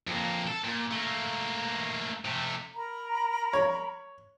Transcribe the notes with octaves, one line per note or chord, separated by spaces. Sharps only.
F2 A#3
A4
A#2
A3 A#3
C3 A3
A#4 A#5 B5
C#5